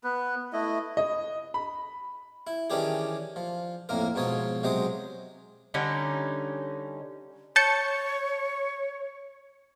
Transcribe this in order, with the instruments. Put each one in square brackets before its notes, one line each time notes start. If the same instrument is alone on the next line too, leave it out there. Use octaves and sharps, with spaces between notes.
[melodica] B3 B4
A3 E4 D#5
[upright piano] D#5
B5
[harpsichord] E4
D#3 E3 C#4 D4 G4 G#4
F3
F2 A2 A#3 A#4
G#2 B2 F3 C#5 D#6
C3 F#3 G#3 C5 D#6
[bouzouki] D3 G3 C#4 D#4
[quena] C#5 [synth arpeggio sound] A5 G6 C#7